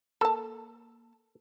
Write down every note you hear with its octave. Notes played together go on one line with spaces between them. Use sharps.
A#3 A4 A5